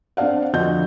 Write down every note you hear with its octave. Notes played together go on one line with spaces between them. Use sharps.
C4 D4 D5 F5 F#5
F2 D3 F4 F#4 D#5 G6